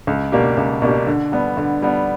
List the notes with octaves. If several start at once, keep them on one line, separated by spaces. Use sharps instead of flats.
C#2
B2 A#3 D4 G4
C#2
B2 A#3 D4 G4
D3
G3 B3 D4
D3
G3 B3 D4